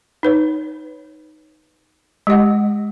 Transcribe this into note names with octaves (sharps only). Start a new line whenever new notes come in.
D#4 B4 C#5
G#3 G4 D#5 F#5